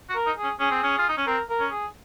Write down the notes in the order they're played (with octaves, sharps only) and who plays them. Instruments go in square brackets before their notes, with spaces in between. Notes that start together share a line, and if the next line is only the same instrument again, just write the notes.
[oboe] F#4
[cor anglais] A#4
[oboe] D#4
[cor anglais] G#4
[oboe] C#4
[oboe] C#4 [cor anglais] G#4
[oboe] C4
C#4
F4
D#4
C#4
[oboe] C4 [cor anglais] A#4
[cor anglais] A#4
[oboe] C#4
[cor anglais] G#4